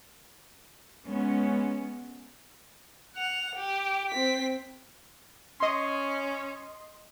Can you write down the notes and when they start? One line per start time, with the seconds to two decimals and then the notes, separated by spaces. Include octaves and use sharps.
1.07 G#3 B3 C#4
3.16 F#5 F7
3.56 G4
4.10 C4 B6
5.60 C#4 D#5 C6